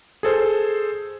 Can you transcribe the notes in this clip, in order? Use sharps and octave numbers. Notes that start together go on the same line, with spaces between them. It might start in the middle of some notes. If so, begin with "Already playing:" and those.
G#4 A4 C5